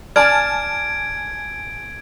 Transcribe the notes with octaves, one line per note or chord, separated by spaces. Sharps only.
D5 G#5 A5 F6 G#6 D7